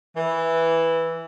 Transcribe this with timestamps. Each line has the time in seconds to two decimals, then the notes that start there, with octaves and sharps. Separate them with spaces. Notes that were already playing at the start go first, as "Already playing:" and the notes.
0.16 E3